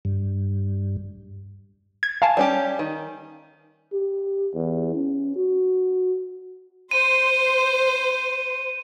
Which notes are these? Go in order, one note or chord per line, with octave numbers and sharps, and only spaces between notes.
G2
G#6
F5 G#5 A5
G3 C#4 G4
D#3
G4
E2
C#4
F#4
C5 D#7